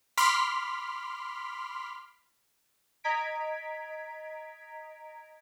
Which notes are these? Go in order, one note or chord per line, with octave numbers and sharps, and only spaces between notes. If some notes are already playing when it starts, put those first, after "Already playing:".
B5 C6 D6 F6 B6
D#5 A#5 G#6 B6 D7